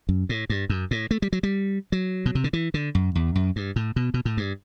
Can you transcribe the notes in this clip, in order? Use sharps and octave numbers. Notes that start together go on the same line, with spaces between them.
F#2
A2
G2
F#2
A2
A3
G3
F#3
G3
F#3
B2
C3
D3
E3
D3
F#2
E2
F#2
G2
A2
B2
B2
A2
G2